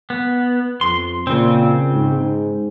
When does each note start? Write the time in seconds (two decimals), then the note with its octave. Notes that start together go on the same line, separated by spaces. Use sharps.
0.10 B3
0.81 F2 C6
1.27 A#2 C#3 C4
1.93 G#2